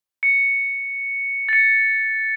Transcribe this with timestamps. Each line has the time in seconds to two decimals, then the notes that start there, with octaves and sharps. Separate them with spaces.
0.23 C#7
1.49 A6 C#7